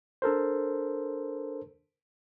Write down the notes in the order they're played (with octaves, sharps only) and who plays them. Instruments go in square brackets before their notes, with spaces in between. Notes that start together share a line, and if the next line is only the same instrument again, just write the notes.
[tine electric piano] D4 A4 A#4 C5